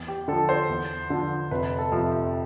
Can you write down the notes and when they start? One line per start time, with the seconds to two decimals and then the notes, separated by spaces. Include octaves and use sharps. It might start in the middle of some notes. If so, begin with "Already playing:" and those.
Already playing: E2
0.08 G4
0.28 D3 A4
0.33 F3
0.49 C5
0.69 E2
1.10 D3 F3
1.51 F1 B4
1.78 A4
1.92 F2 C3 F3
2.05 G4